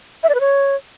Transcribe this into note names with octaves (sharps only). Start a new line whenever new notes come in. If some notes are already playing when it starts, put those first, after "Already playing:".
E5
D5
B4
C#5